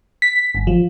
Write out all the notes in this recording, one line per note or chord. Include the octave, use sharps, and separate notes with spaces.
B6
G1
F3